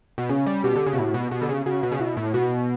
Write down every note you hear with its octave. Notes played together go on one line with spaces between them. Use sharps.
B2
C#3 C#4
G3
B2 G4
D3
C#3
B2
A2 F#4
B2
B2 G4
D3
C#3
C#3 F#4
B2
C#3
B2 E4
A2
B2 F#4